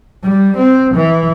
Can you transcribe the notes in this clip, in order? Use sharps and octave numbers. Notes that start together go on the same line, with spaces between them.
G3
C4
E3